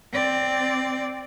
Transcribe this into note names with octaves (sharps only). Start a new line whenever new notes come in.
C4 D5